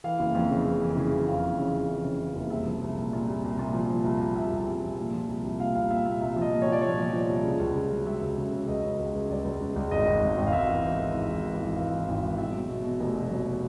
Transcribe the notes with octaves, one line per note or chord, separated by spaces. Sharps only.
E3 F5
F#1
F2
C#3
E3
E3
C#3
F2
F2 F5
E3
C#3
F2
E3
C#3
E3
F#1
C2 E5
F3
C2
A#2
A#2
C2
C2
A#2
F3
F3
C2
C2
C2 E5
C2
C2
F3
A#2
F3
C2
C2
A#2 F5
C2 F5
A#2 E5
A#2 E5
C2 E5
F3
D#5
A#2
C#5
F3
D5
A#2 C#5
F3
F3
C2
C#3
C#2
C#3
F#3
F#3 E5
C#2
C#3
C#3
C#2 D#5
C#3
C#2
C#2
C#2 D5
C#2
C#3
C#2
G#1 D#5
G#1
G#1
G#1
F5
G#1 E5
E3
E3
E3
G#1
E3
E3
G#1
E3 F5
E3
G#1
E3
B2 E5
F#3
B2
B2
F1
B2
F#3